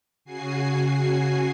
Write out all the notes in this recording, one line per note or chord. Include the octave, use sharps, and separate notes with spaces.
C#3 F#4 G#5 C7